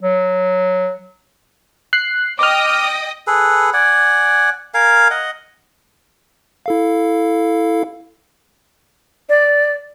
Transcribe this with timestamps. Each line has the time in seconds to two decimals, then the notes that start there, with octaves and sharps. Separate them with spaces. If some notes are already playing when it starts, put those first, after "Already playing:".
0.02 F#3
1.93 F#6 C7
2.39 D#5 G5 D6 D#6 F6
3.27 G#4 A4 B4
3.73 D5 F#5 G#5
4.74 A#4 F5 G#5
5.11 D#5 F#5
6.66 E4 A4 F5
9.29 D5